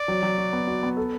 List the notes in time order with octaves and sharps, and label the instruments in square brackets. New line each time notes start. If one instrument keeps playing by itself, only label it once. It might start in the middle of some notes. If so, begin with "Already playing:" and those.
Already playing: [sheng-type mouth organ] D5
[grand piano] F#3
F#3
F#4
B3
F#4
B3
A4